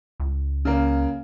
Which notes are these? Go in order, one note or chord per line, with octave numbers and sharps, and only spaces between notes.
C#2
C#3 A#3